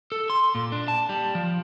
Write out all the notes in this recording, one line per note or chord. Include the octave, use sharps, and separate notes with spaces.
A4
C6
A#2
D4
A5
G3
F3